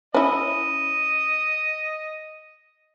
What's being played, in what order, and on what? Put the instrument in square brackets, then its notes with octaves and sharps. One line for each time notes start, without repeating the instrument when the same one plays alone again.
[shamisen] C#4 E4 [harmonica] D#5